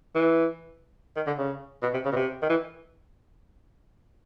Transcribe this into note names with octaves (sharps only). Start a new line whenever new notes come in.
E3
D#3
D3
C#3
B2
C3
C#3
B2
C3
D#3
E3